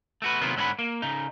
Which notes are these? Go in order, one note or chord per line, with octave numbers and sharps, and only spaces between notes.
A3 F#4 B4
C3 D#3 F#3 A#3 B3 F4
G#2 D3 C#4 C5 F#5 B5
A#3
C#3 D#4